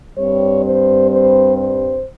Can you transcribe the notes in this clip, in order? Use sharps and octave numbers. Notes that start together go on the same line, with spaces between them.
G2 G3 C4 C#5
C5
C5
C5